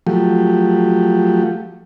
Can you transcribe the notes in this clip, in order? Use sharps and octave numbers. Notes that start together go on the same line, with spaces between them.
F3 F#3 A3 G4